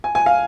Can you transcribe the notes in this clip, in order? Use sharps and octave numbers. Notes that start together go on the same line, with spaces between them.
G#5
G#5
F5